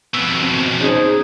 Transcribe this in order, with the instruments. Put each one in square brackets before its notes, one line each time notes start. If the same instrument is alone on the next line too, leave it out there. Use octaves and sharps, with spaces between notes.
[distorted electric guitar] F2 B2 [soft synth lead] E6
[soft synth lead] C4
[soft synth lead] C#4 [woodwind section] D#4 G#4 C5